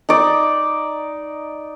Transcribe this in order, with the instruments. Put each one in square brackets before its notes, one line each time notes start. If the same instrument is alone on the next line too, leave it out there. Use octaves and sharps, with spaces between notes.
[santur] D#4 D5